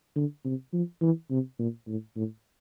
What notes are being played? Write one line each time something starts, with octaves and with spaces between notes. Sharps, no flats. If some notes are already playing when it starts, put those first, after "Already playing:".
D3
C3
F3
E3
C3
A#2
A2
A2